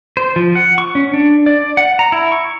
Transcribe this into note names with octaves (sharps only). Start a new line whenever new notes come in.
C5
F3
F#5
C#6
C#4
D4
D5
F#5
A#5
E4
C#6